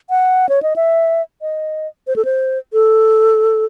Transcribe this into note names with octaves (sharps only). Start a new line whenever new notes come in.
F#5
C#5
D#5
E5
D#5
C5
A4
C5
A4